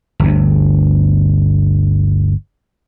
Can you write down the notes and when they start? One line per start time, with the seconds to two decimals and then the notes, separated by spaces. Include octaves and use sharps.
0.20 G1 D2